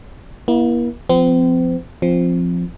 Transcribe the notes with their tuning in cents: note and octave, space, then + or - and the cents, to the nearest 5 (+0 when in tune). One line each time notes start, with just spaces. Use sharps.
A#3 +45 E4 +0
F3 +0 C4 -35
F3 +0 C4 +0